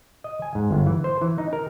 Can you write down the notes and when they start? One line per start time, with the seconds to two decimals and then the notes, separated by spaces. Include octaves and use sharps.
0.24 D#5
0.42 G#5
0.55 G#2
0.71 G1
0.87 E3
1.04 C5
1.21 E3
1.38 D#4
1.53 A#4